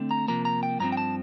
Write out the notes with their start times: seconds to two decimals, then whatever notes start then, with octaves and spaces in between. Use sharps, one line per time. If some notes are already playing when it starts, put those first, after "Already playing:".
Already playing: D3 A3 C4
0.11 A#5
0.28 C3 F3 A#3 A#5
0.45 A#5
0.63 G5
0.80 G2 F3 C4 A#5
0.92 G5
0.97 A5